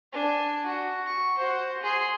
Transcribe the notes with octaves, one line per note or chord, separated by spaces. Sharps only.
D4 G#5
F#4
C#6
F#4 C5
G#4 C6